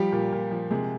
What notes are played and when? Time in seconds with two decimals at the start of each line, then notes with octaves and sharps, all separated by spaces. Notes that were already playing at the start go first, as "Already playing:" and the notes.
Already playing: F3 G3 G4
0.12 A#2
0.33 A#2
0.51 F3
0.71 C3 G#3 G#4